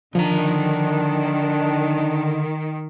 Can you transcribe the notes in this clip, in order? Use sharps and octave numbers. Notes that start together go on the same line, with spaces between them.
D3 D#3 F3 D4 A#5